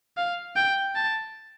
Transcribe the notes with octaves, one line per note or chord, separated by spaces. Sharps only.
F5
G5
A5